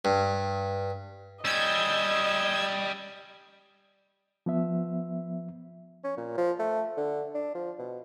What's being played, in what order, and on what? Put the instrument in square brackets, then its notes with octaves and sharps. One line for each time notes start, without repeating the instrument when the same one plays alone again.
[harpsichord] G2
[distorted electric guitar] G3 C#4 [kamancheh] D#5 [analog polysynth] E6 G6 G#6
[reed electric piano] F3 B3 E5
[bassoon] C#4
A#2
F3
A3
D3
D4
F3
B2